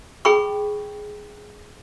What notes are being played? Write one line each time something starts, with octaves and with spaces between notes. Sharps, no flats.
G#4 G5 B5 C#6